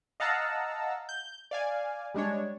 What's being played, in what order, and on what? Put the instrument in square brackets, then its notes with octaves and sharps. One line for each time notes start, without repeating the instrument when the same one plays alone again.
[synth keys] D#5 F5 F#5 A5 A#5 E6
G6
D5 F5 G#5
G3 G#3 D4 C#5